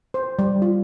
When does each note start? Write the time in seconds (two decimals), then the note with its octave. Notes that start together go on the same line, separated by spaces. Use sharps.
0.14 C5
0.39 G3
0.62 F4